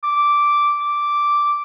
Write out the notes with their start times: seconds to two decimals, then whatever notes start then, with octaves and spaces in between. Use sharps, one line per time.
0.03 D6
0.80 D6